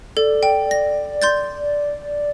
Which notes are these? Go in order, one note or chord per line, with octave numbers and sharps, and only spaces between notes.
A4 D5
G5
A#6
C6 G6 A6